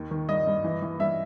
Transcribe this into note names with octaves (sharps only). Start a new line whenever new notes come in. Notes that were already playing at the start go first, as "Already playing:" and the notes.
Already playing: D#2 D#3
D#3
G2 D#5
G2
E3
E3
G2 E5